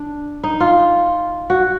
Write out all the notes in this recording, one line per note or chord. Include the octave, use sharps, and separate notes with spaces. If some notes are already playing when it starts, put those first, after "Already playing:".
Already playing: D4
D#4
F4
F#4